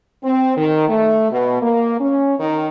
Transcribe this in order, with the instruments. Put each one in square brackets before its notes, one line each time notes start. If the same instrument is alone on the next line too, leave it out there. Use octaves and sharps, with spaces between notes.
[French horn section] C4
D#3
A3
B2
A#3
C#4
D#3